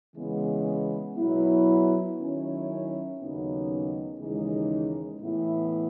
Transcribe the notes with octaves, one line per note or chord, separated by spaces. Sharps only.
C#3 E3 G#3 B3
B2 F#3 B3 E4
D#3 F#3 C#4 E4
D#2 C#3 F#3 B3 D#4
D#2 C#3 E3 G#3 D#4
A2 E3 B3 E4